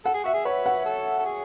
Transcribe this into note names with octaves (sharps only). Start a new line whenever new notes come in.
A4 F#5
G#4
F#4 E5
G#4
B4 C#5
F#5
A4
A4
G#4